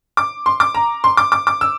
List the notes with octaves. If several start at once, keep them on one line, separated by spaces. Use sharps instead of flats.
D6
C6
D6
A#5
C6
D6
D6
D6
E6